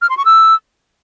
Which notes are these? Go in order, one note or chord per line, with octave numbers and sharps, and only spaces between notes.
F6
C6
C#6
E6